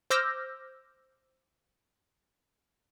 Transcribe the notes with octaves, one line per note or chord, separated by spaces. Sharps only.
C5 D6 E6 F6 G6 A#6